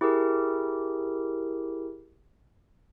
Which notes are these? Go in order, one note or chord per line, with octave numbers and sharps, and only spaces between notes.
E4 G4 G#4 A#4